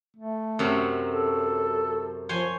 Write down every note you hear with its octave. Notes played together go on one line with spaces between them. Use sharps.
A3
F#2 C3 F#3
A4
F3 C5 C#5 G#5